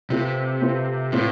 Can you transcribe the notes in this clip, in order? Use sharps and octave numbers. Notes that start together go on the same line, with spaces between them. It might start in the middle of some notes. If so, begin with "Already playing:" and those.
C3 A3 C4 F4 B4
A3 C4 F4 B4
A2 A3 C4 F4 B4